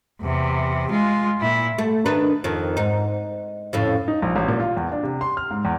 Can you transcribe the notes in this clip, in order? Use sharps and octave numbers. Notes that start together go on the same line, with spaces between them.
E2 C3
G#3 F4
A#2 E4
A3
D#3 D4 B4
F2 D#3
G#2 D#4
F2 A2 C#3
D#4
A#1
A1
A#2
F4
E2
D4
C3
C6
F6
G#2
E2